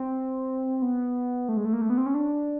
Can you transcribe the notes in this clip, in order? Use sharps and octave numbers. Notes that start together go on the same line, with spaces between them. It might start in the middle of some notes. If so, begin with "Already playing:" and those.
Already playing: C4
B3
A3
G#3
A3
A#3
A3
B3
C4
C#4
D4